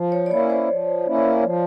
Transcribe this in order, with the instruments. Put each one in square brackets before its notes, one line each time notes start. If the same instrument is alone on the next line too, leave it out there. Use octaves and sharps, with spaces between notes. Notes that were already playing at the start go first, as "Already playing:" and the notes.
Already playing: [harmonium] F3
[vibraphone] C#5
D5
[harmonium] A#3 C#4 E4 [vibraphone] C#5
[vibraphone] C5
[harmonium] F3
A#3 C#4 E4
F3